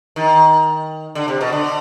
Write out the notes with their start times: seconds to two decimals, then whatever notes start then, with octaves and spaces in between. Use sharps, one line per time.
0.16 D#3
1.15 D3
1.28 C3
1.41 B2
1.52 D3